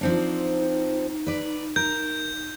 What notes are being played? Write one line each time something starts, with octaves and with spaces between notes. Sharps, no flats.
F3 C4 D4 D#4
B4 D5
A#4 G6